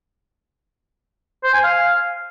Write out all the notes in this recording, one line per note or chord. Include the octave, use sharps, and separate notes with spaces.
C5
G#5
F5